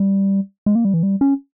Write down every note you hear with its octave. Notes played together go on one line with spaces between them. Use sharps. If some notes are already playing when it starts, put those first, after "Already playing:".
Already playing: G3
G#3
A#3
G3
E3
G3
C#4